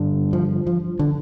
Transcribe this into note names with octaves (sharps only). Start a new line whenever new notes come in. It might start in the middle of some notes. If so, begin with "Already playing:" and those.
Already playing: G2 D3
F3
F3
D3